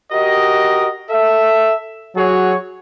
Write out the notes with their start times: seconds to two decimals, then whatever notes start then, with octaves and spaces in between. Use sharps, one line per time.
0.11 F#4 G4 A#4 D#5
1.10 A4 E5
2.16 F#3 F#4 G#4 C#5